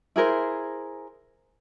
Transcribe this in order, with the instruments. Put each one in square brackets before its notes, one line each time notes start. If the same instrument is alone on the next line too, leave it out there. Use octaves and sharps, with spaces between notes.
[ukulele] E4 G#4 A#4 C5